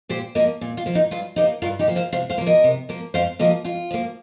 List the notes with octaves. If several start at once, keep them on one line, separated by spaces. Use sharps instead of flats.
A#2 G4 C5
F3 A#3 A#4 D#5
A#2
F4
F3 A#3
D#4
G2 F4
F3 A#3 D#4 G4
G2 F4 A#4
D#4 G4
F3 A#3
C5 F5
C3 C5 F5
C5 F5
F3 A#3
A#4 D#5
C3
F3 A#3
F2 C5 F5
F3 A#3 A#4 D#5
F2 F4
F3 A#3